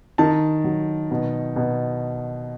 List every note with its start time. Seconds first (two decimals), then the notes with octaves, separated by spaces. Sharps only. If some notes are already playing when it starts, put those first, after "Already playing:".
0.18 D#3 A5
0.64 F#3
1.11 B2
1.56 B2